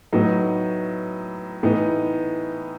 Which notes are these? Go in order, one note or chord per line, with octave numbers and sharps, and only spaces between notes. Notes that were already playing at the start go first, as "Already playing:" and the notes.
A2 F#3 B3 D#4
A2 E3 B3 D#4